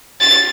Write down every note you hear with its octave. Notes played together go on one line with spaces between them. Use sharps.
A6